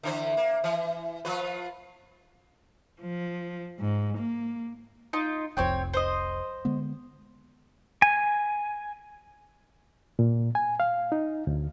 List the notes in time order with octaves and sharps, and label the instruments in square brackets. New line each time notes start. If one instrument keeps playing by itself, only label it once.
[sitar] D3 E3 C5
A#3
E3
F3 F4 B4
[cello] F3
G#2
A#3
[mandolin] D#4 F4
[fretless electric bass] F1 C2 F2 [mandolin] C4 C#5 G5
[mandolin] C5 C#5 D#5
[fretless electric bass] D3 G#3 B3
[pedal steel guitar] G#5
[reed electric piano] A#2
G#5
F5
D#4
D2